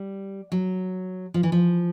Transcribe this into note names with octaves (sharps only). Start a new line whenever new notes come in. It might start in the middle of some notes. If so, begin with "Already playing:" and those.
Already playing: G3
F#3
F3
E3
F3